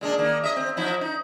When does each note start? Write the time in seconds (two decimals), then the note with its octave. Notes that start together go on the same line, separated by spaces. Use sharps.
0.01 A#2 G#3 D4
0.18 D#3 A#3
0.44 D#5 E5
0.56 C4
0.77 F3 D#4 E4
1.01 D#4